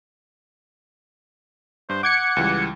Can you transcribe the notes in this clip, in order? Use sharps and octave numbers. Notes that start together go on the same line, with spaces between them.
G2 C5
F#5 D6 G6 G#6 C#7
C#2 E3 G3